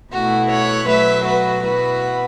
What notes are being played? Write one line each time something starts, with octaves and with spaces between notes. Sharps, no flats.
B2 A3 E4 F#4
C#5 F#5
B2 F#3 A3 B4 E5
F#4 B4
B2 B3 E4 F#4 B4